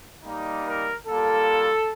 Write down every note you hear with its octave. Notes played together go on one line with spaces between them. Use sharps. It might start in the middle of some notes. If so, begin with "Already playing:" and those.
G3 A#3 D#4
A#4
G3 A#3 F4 A4